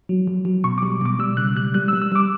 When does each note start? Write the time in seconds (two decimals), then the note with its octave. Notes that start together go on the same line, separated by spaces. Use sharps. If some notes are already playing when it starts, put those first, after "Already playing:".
0.09 F#3
0.27 F#3
0.45 F#3
0.64 B2 C#6
0.78 D6
0.82 G3
1.01 B2 D6
1.19 G3 E6
1.37 C#3 F#6
1.56 G3 F#6
1.74 G3 F#6
1.88 E6
1.93 G3
2.02 E6
2.12 G3 D6